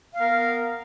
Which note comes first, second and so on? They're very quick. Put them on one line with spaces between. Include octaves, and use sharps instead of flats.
F5 B3 A#4